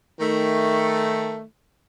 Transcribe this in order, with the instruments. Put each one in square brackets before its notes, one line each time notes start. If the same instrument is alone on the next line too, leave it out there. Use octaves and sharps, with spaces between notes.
[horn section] D#3 A3